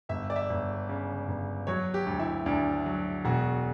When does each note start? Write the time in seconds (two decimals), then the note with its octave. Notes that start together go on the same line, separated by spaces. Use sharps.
0.09 G1 E5
0.30 D5
0.36 E5
0.50 G1
0.89 C#3
1.28 G1
1.67 F#3 C#5
1.94 G4
2.06 D2
2.19 E4
2.46 D2 D4
2.86 F#3
3.25 E1 F#4